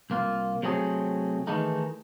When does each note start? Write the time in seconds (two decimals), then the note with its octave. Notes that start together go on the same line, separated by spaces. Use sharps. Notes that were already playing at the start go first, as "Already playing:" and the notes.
0.10 C2 A#3 F4
0.63 C3 F#3 A3 C4 G#4
1.47 D#3 E3 G#3 A3 D#4